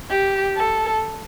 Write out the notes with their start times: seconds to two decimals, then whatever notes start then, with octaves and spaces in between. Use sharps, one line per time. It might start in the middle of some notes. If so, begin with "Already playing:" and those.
0.10 G4
0.57 A4